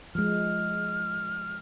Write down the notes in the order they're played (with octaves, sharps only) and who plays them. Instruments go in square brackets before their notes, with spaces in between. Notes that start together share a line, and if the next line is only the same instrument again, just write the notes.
[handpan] F3 G#3 [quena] F6